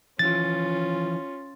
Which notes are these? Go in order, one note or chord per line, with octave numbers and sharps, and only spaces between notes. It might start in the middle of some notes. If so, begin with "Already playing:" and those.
E3 F3 C#4 F4 A6